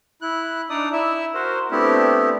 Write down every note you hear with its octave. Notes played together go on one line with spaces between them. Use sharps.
E4 F#6
D4 D#4 D5 D#6
E4 E5
F#4 A#4 C5
A3 B3 C4 D4 E4 G4